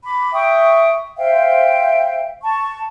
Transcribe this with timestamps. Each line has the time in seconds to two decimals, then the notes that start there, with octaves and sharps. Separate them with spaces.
0.05 B5 D6
0.33 E5 G5 C#6 D#6
1.17 C5 E5 F5 G5
2.42 A5 C#6